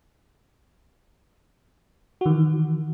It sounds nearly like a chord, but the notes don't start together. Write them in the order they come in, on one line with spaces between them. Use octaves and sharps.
F#4 D#3 E3